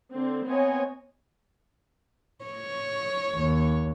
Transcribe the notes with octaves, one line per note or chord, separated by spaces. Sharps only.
D3 C4
B3 C4 C#5 D#5 G#5
C#5
D#2